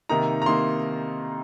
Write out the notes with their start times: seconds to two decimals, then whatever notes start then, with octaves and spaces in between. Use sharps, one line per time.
0.09 C3 D#3 A#3 D#4 A#5
0.42 A#5
0.46 C3 D#3 A#3 D#4 C6